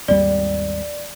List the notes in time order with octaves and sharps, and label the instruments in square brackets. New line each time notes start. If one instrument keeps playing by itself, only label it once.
[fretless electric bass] G#1 D#2 G3 [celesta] D5